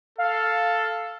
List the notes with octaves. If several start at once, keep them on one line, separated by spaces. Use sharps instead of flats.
A4 F5